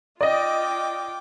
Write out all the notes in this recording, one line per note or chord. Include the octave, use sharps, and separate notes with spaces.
F4 D5 D#5 G5 D6